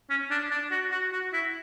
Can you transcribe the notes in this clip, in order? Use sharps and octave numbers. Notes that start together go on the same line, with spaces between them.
C#4
D4
D4
F#4
F#4
F#4
E4